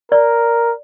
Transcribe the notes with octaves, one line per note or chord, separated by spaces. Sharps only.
A#4 D5